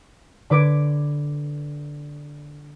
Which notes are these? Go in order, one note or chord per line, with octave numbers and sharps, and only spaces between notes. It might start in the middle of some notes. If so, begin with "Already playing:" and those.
D3 B4 D6 G#6 D7